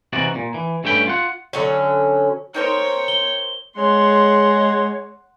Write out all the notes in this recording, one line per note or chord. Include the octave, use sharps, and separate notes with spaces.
C3 E3 D#4 F#4 D5
A#2
E3
G2 A3 C#4 G5 B5
F4 F#5
D3 F#3 C#4
D#4 A#4 C5 C#5 G5
G7
G#3 C#5 F#5 C6